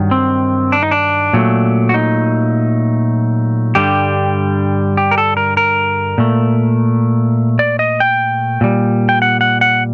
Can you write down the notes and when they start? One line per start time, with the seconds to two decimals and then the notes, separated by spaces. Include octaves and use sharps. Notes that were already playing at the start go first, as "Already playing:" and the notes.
Already playing: G2 D#3 F#3
0.11 C4
0.72 D4
0.83 D#4
0.91 D4
1.33 A#2 F#3 A3
1.89 F#4
1.94 D#4
3.75 G2 D3 G3 G4
4.97 G4
5.11 A#4
5.18 A4
5.37 A#4
5.57 A#4
6.18 A#2 A3
7.59 D5
7.79 D#5
8.00 G5
8.61 A#2 G3
9.09 G5
9.22 F#5
9.41 F#5
9.61 F#5